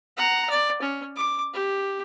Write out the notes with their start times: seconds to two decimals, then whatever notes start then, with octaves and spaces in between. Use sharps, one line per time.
0.17 F#5 A#5
0.50 D5
0.82 C#4
1.16 D6
1.54 G4